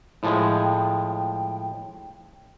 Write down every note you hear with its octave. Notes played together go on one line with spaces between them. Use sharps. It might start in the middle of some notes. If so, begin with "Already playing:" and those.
A2 F3 G#3 G5